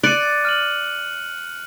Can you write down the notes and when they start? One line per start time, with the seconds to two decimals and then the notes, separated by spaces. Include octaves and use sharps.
0.03 D5 F#6 C#7 D#7
0.45 F6 D#7 F#7